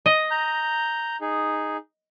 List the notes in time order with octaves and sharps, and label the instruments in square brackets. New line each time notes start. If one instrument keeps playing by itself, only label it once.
[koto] D#5
[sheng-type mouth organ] A#5 G6
D#4 G#4